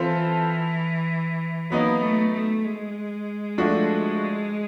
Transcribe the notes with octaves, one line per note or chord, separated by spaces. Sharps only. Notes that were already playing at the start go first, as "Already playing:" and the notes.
Already playing: E3 C4 F4 A4 C5
F#3 A#3 B3 D#4
A3
A3
G#3
F3 A3 D4 F#4